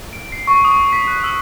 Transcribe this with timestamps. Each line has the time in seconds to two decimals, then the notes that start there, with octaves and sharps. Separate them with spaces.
0.13 D7
0.32 C7
0.47 C#6
0.65 D#6
0.93 B6
1.08 F#6
1.24 E6